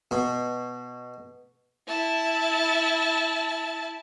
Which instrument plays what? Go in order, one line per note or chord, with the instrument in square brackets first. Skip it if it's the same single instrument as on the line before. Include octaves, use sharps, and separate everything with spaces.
[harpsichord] B2
[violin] E4 A5